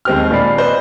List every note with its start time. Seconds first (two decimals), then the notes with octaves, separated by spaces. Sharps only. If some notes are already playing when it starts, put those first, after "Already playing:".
0.05 D#2 G#3 C4 G4 F6
0.31 A#2 D5 B5 C7
0.58 B4 C5 D5 D#5